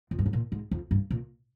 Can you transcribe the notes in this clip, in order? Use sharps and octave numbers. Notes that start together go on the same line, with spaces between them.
F2
G2
G#2
A#2
G#2
F2
G2
A#2